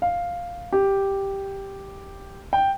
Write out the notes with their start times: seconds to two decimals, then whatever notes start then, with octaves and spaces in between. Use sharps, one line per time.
0.02 F5
0.73 G4
2.53 G5